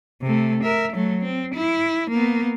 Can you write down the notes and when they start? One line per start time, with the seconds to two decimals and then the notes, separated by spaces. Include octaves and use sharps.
0.22 C3 A3
0.64 A#4 E5
0.93 F#3 A3
1.22 C4
1.55 E4
2.10 A#3 B3